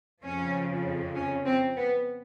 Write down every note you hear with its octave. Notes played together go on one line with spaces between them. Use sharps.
F2 C#3 F3 C#4
C#4
C4
B3